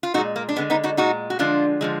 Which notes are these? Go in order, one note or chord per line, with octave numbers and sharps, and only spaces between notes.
F4
A#2 G#3 D#4 F#4
A#3
D4
D3 G#3 B3
B3 D#4
D#4 F#4
A#2 G#3 D#4 F#4
F#4
D3 F3 G#3 D4 F4
D3 F3 G#3